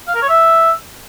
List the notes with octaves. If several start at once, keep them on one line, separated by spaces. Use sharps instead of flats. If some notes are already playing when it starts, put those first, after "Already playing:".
F5
A#4
C#5
E5